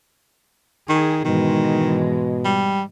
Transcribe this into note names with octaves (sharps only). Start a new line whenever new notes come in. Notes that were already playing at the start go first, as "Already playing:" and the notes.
D#3 G#4
G#2 B2 D#3 E3 G#3
G3